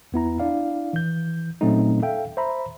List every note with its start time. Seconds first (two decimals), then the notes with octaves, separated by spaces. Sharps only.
0.12 E2 B3 E4 A#5
0.40 D4 E4 D5 F5
0.93 E3 G6
1.61 A#2 F#3 A3 C4 C#4 D#4
2.02 A4 E5 F5 G5
2.37 C5 E5 A#5 B5